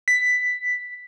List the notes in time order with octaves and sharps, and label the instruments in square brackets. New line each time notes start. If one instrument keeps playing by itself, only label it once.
[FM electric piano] B6